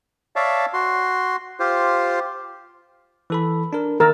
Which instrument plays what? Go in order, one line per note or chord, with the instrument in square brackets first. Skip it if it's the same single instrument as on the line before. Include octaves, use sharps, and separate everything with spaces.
[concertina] C#5 D5 E5 F5 A5
F#4 C6
F4 G4 C5
[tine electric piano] E3 A4 B5
D4 A#4
[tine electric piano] D#3 E6 A6 [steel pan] A#4